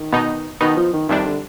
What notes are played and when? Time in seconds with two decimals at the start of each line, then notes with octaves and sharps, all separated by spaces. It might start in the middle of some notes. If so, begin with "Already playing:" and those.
Already playing: D#3
0.12 B2 B3 D#4
0.61 B2 D#3 B3 D#4
0.77 F3
0.93 D#3
1.09 F2 C3 D#3 G3 D4
1.25 D3